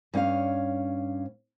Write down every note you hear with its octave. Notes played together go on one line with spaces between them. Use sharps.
G2 C#4 C#5 F5